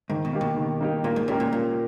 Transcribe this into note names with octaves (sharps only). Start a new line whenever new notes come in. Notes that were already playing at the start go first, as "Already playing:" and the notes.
G#2 D#3
B2
A#3 D#4 G4
B2
D#3
A#3 D#4 G4
A#2 A#3
G#2
A#2 C#4 G4 A#4
A#2
A#2 A#3